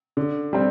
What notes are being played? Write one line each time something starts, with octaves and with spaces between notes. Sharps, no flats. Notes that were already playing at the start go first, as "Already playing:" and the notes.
D3
G3 C4